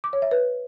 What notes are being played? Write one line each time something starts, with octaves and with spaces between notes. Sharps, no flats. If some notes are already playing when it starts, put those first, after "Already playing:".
D6
C#5
E5
B4